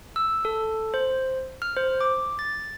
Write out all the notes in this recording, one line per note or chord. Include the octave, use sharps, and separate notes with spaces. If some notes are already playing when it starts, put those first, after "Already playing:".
E6
A4
C5
F6
C5
D6
A6